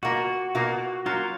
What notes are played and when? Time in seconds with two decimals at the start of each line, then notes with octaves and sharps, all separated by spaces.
0.03 B2 A#3 F4 F#4
0.55 B2 A#3 F4
1.06 F#3 A#3 C#4 F4 F5